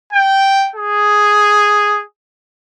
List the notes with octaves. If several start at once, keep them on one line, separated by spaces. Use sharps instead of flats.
G5
G#4